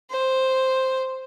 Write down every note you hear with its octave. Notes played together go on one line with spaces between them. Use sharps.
C5